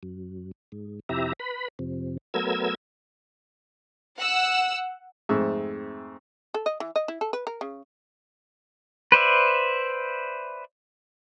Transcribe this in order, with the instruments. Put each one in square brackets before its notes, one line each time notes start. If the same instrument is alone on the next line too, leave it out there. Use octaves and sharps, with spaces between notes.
[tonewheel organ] F#2
G#2
F2 C3 E4 G4 E5 A#5
B4 B5
F2 C3
F#3 A3 B3 A#4 E6 G#6
[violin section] F#5 E6
[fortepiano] F2 G#2 A3 C4 E5
[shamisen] A4
D#5
E3
D#5
E4
A4
B4
A#4
C#3
[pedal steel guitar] B4 C5 D5 E5